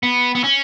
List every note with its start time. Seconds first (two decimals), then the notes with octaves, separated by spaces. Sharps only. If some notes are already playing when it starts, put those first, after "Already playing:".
0.03 B3
0.35 B3
0.44 C#4